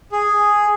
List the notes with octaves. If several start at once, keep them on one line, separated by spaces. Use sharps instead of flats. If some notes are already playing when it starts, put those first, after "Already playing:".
G#4